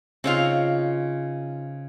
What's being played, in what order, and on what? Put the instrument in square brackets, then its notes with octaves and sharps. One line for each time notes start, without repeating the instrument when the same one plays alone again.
[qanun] C#3 D#4 F4 [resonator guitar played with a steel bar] C4 C#5 F5